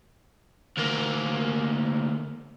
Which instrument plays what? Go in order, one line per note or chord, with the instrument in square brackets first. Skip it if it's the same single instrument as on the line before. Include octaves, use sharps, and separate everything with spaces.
[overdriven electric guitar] D2 A#3